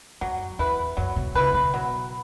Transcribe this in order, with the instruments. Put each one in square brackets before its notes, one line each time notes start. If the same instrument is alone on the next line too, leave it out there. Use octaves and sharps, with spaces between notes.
[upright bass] F#2 [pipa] F#3
[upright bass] E2 [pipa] E4 B4
[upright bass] F#2 [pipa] F#3
[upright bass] B2
[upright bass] C#3 [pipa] E4 B4
[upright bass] B2
[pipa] F#3